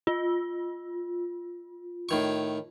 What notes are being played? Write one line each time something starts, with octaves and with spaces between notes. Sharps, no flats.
F4
A2 D#3 C#6